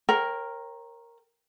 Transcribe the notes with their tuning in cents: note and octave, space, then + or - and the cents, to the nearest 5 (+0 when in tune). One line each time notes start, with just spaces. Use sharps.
A#4 +0 C#5 -35 G5 +0